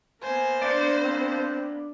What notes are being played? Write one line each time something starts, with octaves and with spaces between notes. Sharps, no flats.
A#3 B3 C5 G#5
D4 D5
C4